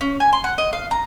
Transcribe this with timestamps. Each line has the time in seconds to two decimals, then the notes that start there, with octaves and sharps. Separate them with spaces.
0.01 C#4
0.20 G#5
0.33 C6
0.44 F#5
0.58 D#5
0.73 F5
0.91 A#5